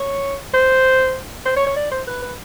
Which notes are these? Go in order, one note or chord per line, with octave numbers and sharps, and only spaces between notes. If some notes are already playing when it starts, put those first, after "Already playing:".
Already playing: C#5
C5
C5
C#5
C#5
D5
C5
B4
B4